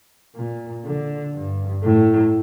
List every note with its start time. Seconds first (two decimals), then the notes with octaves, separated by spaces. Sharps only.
0.36 A#2
0.85 D3
1.35 G2
1.83 A2